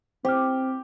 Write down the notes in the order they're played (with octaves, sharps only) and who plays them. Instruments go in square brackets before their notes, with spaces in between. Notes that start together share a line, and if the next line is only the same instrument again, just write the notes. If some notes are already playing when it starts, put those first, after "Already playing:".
[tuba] C4 [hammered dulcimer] G4 [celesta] C5 F6